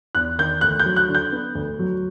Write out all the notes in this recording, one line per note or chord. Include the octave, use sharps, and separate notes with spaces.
E2 F#6
D#3 G6
D2 F#6
G6
F#3
F#6
D3
G6
B3
D2
F#3